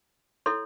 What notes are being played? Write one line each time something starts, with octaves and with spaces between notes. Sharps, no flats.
E4 A4 C#5 C6